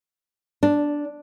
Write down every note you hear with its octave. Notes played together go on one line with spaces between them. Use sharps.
D4